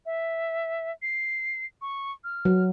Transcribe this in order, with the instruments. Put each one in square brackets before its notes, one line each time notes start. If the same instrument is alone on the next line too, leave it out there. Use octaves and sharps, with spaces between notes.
[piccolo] E5
C7
C#6
F6
[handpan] F#3